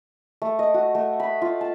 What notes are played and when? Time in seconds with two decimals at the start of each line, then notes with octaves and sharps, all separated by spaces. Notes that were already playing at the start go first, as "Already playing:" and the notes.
0.42 A3
0.59 D#5
0.74 F#4
0.95 A3
1.20 B5
1.42 F4
1.61 A5